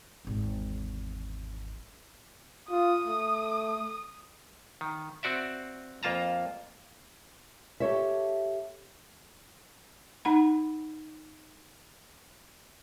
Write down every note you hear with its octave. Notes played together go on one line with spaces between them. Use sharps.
G#1 E2
F4 D#6
A3
D#3
C4 F#4 D5 E5
F2 A#3 F4 A5 A#5
G4 A4 C#5 E5
D#4 F#5 B5